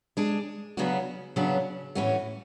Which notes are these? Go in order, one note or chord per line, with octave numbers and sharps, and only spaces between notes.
G#3 D4 G#4
C#3 F#3 B3 D4 F#4
C#3 F#3 B3 D4 F#4
A2 E3 A3 C#4 F#4